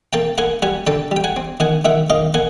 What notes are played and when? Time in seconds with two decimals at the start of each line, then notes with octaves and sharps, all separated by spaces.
0.13 A#3 G5 A5
0.38 A#3 F#5 G#5
0.62 G3 F#5 G#5
0.87 D3 G5 A5
1.11 G3 G5
1.24 F#5 G#5
1.36 C4
1.60 D#3 F#5 G#5
1.85 D#3 E5 F#5
2.10 D#3 D#5 F5
2.34 A#3 F#5 G#5